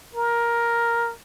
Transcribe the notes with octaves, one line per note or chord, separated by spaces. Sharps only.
A#4